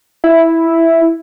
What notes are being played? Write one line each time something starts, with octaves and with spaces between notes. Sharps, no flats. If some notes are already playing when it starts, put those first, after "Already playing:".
E4